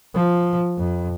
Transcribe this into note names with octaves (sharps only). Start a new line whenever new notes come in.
F3
F2